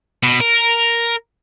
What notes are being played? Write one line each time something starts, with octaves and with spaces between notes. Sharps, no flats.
B2
A#4